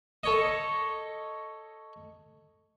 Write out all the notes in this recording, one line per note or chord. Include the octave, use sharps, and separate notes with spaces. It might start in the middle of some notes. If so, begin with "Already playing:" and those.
A4 C#5 D#5